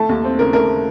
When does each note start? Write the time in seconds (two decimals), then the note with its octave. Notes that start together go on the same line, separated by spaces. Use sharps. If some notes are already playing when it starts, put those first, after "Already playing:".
Already playing: A3 A5
0.09 D#2
0.24 C4
0.39 C#3 A#4
0.53 A3 A#4